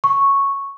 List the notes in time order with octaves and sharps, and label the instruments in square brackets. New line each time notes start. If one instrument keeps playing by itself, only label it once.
[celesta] C#6